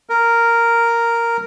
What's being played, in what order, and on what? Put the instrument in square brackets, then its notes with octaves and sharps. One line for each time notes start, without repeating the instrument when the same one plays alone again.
[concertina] A#4